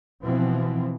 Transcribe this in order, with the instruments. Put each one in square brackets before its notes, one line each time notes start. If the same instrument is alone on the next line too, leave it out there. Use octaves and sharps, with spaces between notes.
[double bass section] B2 E3 F3 C4